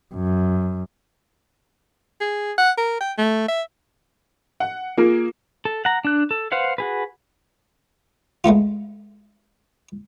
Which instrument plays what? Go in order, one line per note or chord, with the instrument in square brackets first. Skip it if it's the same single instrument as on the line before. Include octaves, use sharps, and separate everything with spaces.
[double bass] F#2
[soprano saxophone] G#4
F#5
A#4
G5
A3
E5
[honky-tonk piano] F#5
[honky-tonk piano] A#3 G#4 A#4 [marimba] F4
[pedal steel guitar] A4
F#5 A#5
D4 F#6
A4
B4 C5 F5 F#5
F#4 G#4 B4
[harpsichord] G#3 A3 B3 F4